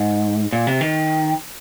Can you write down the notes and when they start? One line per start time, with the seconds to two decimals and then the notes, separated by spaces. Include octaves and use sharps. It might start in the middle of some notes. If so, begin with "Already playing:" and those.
Already playing: G#2
0.53 A#2
0.67 C3
0.81 D#3